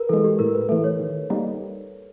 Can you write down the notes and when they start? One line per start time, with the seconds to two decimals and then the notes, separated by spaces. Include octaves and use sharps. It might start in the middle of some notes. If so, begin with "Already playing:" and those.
Already playing: A#4 B4
0.09 E3 G#3 A4
0.24 G4
0.39 A2 A#4
0.55 B4
0.69 E3 A3 A4
0.84 C#5
1.00 D#3
1.30 G3 A#3 D#4